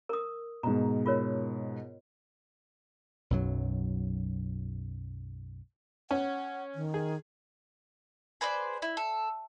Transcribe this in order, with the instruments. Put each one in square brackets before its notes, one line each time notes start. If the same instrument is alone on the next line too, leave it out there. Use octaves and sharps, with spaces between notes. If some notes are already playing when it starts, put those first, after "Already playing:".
[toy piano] A#4 D#6
[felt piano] G#2 B2 [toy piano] A#5
[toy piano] F4 A#4 C#5
[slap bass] B1 F#2 F#3
[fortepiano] C#4 [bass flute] F#5
[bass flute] D#3
[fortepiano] G#4
[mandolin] G#4 B4 C5 D5
E4
A4